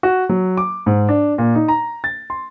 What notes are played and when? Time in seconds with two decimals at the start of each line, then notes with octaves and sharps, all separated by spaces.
0.03 F#4
0.29 F#3
0.57 D6
0.86 G#2
1.09 D4
1.38 A#2
1.55 D#4
1.68 A#5
2.04 A6
2.30 C6